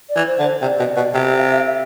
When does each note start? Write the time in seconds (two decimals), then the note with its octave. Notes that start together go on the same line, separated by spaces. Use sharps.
0.09 D5
0.16 E3
0.27 C5
0.39 D3
0.44 C5
0.62 C3 D5
0.79 B2
0.96 B2
1.14 C3
1.32 E5
1.39 F5
1.49 E5
1.57 F5
1.65 E5